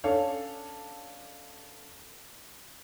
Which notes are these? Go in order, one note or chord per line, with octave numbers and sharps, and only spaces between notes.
C#4 D4 A4 C#5 F5